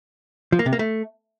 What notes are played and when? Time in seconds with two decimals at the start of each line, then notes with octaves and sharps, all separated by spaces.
0.52 F3
0.59 A#3
0.66 C3
0.73 A#3
0.79 A3